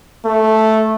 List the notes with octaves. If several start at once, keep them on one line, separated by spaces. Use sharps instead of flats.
A3